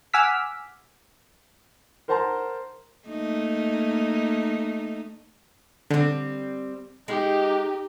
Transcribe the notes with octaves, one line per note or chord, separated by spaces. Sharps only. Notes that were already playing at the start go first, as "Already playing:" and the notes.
F#5 G#5 D6 E6 F6 B6
A#4 C5 F#5 A5 A#5 C6
A3 A#3 D#4
D3 G3 C4
G#3 D#4 G4